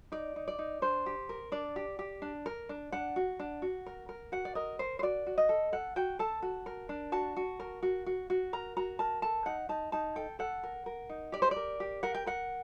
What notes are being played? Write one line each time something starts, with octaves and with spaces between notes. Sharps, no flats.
D#4 D5
D#4
D5
D#4
D4 C5
G4
A#4
D4 D5
G4
G4
D4
A#4
D4
D4 F#5
F#4
D4
F#4
A#4
A#4
F#4 F#5
D5
A#4 D#5
A#4 C5
C5
F#4 D5
F#4
D#5
A4
A4 F#5
F#4 G5
A4 A5
F#4
A#4
D4
F#4 A5
F#4
A#4
F#4
F#4
F#4
A#4 A#5
F#4 A#5
A#4 A5
A4 A5
D#4 F#5
D#4 A5
D#4 A5
A4 G5
A4 F#5
A#4
A#4
D#4
G4 D5
C5
D5
A#4
G4
A#4 F#5
G5
A#4 F#5